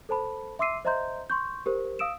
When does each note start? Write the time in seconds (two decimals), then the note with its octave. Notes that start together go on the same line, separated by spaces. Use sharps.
0.09 A4 C5 A5 B5
0.59 E5 C6 D6 E6 C7 D#7
0.85 C5 D#5 E5 A#5 C6 G6
1.30 C6 C#6 G6
1.66 G4 A#4 C5
1.99 F5 D#6 E6 D7 E7